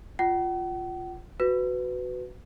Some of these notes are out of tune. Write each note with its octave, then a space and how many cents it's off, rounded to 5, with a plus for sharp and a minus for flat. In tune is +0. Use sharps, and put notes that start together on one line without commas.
F4 +0 F#5 +45
F#4 +0 B4 +15